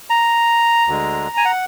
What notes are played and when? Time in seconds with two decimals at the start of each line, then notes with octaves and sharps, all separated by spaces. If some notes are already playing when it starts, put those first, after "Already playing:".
0.10 A#5
0.87 D2 D3 G#3
1.37 G#5
1.45 F#5